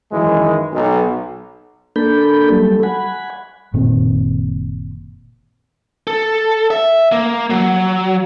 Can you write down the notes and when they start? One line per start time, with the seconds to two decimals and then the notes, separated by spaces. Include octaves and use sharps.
0.12 F#2 D#3 E3 G#3
0.73 B1
1.96 A#3 D4 A4 B5 G6
2.50 F#3 G3 A4
2.83 F#5 G#5 B5
3.74 F#1 A#2 D#3 C4
6.07 A4
6.71 E5
7.12 A#3
7.50 F#3